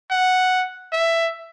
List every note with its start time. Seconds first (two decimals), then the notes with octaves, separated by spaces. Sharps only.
0.11 F#5
0.92 E5